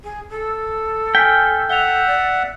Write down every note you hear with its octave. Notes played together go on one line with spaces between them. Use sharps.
G#4
A4
G5 G#5 F6 B6
E5 F#5 F7 G7
D5